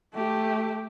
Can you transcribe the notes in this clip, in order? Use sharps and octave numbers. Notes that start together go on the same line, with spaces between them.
A3 G4